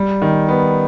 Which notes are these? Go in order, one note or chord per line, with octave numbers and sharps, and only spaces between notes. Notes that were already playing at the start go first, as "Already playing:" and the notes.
Already playing: G3
D#3
B3